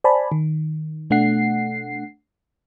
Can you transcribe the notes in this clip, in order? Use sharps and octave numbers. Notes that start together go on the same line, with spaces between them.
C5 D5 G#5 A5 B5
D#3
B2 A3 D4 F#5 C7